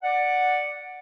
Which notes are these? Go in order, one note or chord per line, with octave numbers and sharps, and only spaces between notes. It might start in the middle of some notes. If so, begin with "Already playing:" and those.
D5 F#5